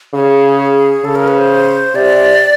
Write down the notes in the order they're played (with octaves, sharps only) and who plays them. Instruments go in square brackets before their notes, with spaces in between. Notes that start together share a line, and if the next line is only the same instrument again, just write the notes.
[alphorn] C#3 [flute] G#4
[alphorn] C#3 [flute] A4
[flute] A#4
B4
C5
[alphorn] C3 [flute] D5